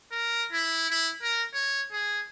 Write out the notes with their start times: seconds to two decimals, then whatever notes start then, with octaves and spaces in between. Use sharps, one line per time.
0.12 A#4
0.52 E4
0.90 E4
1.22 A#4
1.54 C#5
1.92 G#4